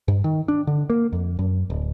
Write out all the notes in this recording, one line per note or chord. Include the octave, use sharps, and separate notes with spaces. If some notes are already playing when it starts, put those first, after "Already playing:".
G2
D#3
D4
D3
A#3
F2
F#2
D1